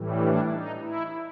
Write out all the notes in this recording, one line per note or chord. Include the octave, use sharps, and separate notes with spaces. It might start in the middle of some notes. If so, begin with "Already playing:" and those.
Already playing: A2 E3 G3
D4
D#4
E4